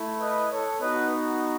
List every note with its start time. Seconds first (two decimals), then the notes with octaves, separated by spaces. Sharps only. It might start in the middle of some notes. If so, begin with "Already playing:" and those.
Already playing: A3 E4
0.20 B4 D#5
0.51 A4 C#5
0.80 B3 D#4 F#4 B4 D#5